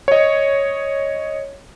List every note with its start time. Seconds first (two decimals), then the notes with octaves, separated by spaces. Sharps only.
0.08 C#5 D#5